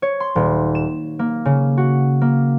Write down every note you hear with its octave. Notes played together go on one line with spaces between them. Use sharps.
C#5
C6
D#1
E7
A#3
C#3
F#4
A#3